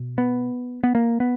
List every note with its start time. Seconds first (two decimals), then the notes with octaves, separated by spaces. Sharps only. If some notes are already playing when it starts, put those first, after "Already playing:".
Already playing: B2
0.18 B3
0.84 B3
0.95 A#3
1.20 B3